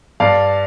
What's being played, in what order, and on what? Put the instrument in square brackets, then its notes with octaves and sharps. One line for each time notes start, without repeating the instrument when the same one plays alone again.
[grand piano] G2 D5 F5